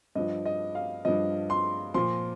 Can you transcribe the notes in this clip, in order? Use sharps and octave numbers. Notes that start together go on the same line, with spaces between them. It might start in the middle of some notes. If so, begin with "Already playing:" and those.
G2 F3 D#5
D#5
F5
G2 F3 D#5
C6
A#2 F3 C6